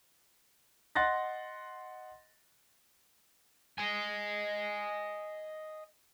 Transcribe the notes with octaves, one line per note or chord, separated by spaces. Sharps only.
D#5 F#5 C6 F#6 A6 A#6
D#5 G#5